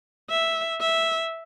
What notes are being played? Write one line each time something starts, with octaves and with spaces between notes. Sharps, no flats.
E5
E5